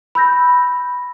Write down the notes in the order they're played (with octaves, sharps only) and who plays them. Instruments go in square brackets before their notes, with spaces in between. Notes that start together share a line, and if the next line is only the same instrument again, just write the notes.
[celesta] B5 E6 G6 A#6